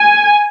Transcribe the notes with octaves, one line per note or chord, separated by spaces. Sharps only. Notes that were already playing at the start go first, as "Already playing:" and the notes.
Already playing: G#5